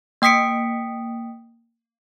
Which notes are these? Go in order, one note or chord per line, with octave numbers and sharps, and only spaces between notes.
A#3 G5 D#6 B6 C#7 D7